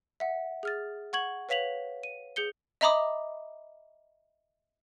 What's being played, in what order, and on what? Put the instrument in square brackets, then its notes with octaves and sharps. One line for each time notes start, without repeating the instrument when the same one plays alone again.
[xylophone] E5 F#5
G#4 F6 A6
F#5 C#6 G#6 F#7
B4 C#5 F5 B6 F7 F#7
D#7
G#4 G6 C#7 G7
D#5 E5 A#5 B5 D6 D#6